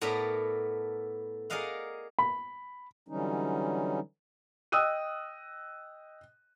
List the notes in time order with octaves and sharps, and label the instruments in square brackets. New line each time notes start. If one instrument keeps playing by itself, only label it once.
[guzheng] A2 B3 A4 A#4 D5 A#5
G#4 A#4 D5 D#5 F5 F#5
[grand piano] B5
[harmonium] D3 E3 F#3 G3 C#4 D#4
[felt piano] D#5 G5 D#6 E6 F#6 D#7